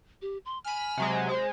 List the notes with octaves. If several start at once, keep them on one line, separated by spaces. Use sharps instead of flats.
G4
C6
G#5 B5 F6
C3 F#3 G#3
G#3 C5